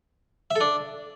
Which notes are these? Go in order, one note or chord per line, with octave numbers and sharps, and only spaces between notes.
E5
A4
D4